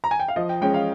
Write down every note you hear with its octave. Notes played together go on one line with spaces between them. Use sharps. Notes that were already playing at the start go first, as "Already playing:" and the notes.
A#5
G#5
G5
F5
F3 D#5
G5
G#3 C#4 G5
F5